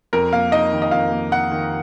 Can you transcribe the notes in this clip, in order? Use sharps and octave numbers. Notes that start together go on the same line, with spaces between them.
F2 A#4
A#3 F5
D#4 D#5
D#3
D#5
F2 F5
A#3
D#4 F#5
D#3